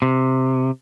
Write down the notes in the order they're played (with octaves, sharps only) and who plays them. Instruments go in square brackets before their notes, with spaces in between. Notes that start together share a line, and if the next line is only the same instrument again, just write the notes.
[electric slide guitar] C3